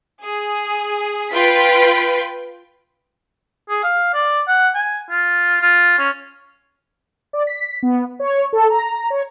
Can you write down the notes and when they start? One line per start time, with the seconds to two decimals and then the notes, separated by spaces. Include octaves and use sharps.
0.24 G#4
1.33 F4 B4 G5 B6
3.70 G#4
3.83 F5
4.14 D5
4.48 F#5
4.75 G#5
5.10 F4
5.61 F4
5.98 C#4
7.33 D5
7.47 B6
7.83 B3
8.20 C#5
8.53 A4
8.70 A#5
9.10 C#5